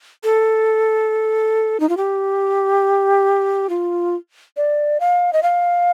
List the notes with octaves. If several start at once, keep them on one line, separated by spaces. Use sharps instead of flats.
A4
D#4
F4
G4
F4
D5
F5
D#5
F5